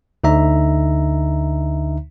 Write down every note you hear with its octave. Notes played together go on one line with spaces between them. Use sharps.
D2 D3 D#4 E5 A#5